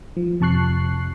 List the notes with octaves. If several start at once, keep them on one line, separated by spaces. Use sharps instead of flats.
F3
F2 C3 A5 C#6 F#6 C7